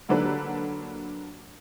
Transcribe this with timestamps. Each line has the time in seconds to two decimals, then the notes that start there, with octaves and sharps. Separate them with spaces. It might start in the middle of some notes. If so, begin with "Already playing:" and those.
0.09 D3 F#3 A#3 D4 A4 B4